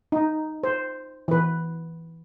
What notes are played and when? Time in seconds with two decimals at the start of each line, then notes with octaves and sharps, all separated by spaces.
0.12 D#4
0.64 C5
1.28 E3 B4